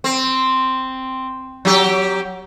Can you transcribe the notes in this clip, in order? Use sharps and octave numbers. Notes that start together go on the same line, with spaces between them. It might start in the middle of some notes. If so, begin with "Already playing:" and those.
C4
F#3 G4